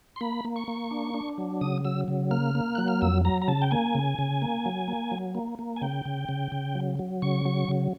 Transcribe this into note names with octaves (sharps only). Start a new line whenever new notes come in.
C6
A#3 B5
A#3
C#6
A#3
D4
D4
F#3
C#3 D#6
F#3 E6
C#3
A#3 F6
A#3
F#3 F#6
F6
F2 E6
F#3 A#5
A#5
C#3 A5
G5
A#3 G#5
C#3
C#3
A#3
F#3
A#3
F#3
A#3
A#3
G#5
C#3 G5
C#3
C#3
C#3
F#3
F#3
C#3 C#6
F#3
C#3